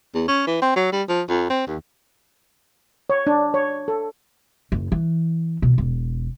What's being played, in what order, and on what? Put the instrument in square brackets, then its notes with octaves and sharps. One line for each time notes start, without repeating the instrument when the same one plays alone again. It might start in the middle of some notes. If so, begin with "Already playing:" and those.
[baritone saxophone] E2
C#4
E3
C4
F#3
G3
F3
F2
C4
D#2
[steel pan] C#5
D4
C#5
A4
[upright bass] F#1
E3
B2
E1